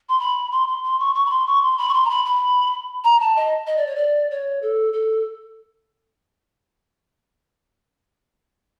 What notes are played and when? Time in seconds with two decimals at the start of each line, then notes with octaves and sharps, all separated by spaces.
0.09 C6
0.20 B5
0.52 C6
0.68 C6
0.84 C6
1.00 C#6
1.15 C#6
1.26 B5
1.31 C6
1.47 C#6
1.62 C6
1.78 B5
1.89 C#6
1.94 C6
2.05 A#5
2.10 B5
2.25 B5
3.04 A#5
3.20 A5
3.36 D#5
3.67 D#5
3.77 D5
3.87 C#5
3.96 D5
4.31 C#5
4.62 A4
4.93 A4